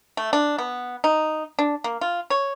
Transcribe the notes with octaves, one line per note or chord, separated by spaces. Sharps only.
A3
D4
B3
D#4
D4
A#3
F4
C#5